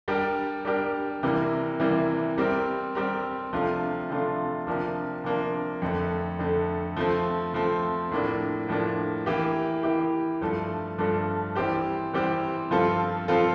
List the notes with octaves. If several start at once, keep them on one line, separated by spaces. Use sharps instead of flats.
G3 D4 G4 A#4
G3 D4 G4 A#4
C3 E3 G3 A#3
C3 E3 G3 A#3
G3 C4 G4 A#4
G3 C4 G4 A#4
C3 F3 A3 D4 F4
C3 F3 A3 D4 F4
C3 F3 A#3 D4
C3 F3 A#3 D4
F2 D3 A3
F2 D3 A3
F3 A3 C4
F3 A3 C4
A2 F3 A#3 D4
A2 F3 A#3 D4
E3 A#3 E4 G4
E3 A#3 E4 G4
G2 F3 A3 D4 A4
G2 F3 A3 D4 A4
E3 G3 C4 G4 C5
E3 G3 C4 G4 C5
G2 F3 C4 F4 A4
F3 C4 F4 A4